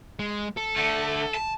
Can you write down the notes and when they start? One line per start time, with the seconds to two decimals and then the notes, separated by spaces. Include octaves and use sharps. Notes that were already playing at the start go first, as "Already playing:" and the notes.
0.19 G#3
0.57 A4
0.76 D3 A3
1.34 A5